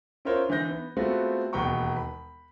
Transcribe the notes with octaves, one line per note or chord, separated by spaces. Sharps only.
C#4 E4 F4 A#4 C5 C#5
D3 E3 D#4 G6 A#6
B3
G#3 A3 B3 C4 F4 F#4
E1 D#2 B3 G5 A#5 C#6
B5